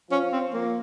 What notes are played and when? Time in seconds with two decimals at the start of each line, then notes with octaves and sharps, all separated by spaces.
0.10 F3 C#4
0.32 C4
0.53 A#3